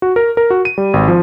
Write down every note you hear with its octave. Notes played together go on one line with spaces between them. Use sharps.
F#4
A#4
A#4
F#4
D#7
G3
G#1
F3